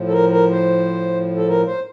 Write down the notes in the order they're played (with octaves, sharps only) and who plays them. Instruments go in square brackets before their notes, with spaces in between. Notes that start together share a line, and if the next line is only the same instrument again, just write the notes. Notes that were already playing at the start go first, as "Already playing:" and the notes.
Already playing: [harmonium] A2 F3
A4
A#4
A#4
C5
A4
A#4
C5